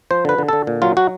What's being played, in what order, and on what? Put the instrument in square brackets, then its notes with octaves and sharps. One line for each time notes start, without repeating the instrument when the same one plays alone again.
[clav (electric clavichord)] F3 C5
D3 B4
D3
D3 A4
A#2
F#3 F4
F#3 F#4